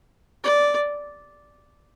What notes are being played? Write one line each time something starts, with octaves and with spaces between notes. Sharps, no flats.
D5